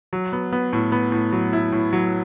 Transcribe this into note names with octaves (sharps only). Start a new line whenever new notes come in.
F#3
B3
B3
A2
B3
A2
F#3
E4
A2
F#3